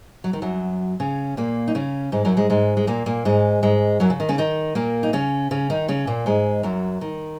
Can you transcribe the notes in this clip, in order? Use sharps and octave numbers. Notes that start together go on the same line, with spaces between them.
F#3
D#3
F#2 F#3
C#3 C#4
A#2 A#3
D#4
C#3 C#4
G#2 G#3
F#2 F#3
G#2 G#3
G#2 G#3
G#3
A#2 A#3
A#2 A#3
G#2 G#3
G#2 G#3
F#2 F#3
C#3
D#3
C#3 C#4
D#3 D#4
A#2 A#3
D#4
C#3 C#4
C#3 C#4
D#3 D#4
C#3 C#4
A#2 A#3
G#2 G#3
F#2 F#3
D#3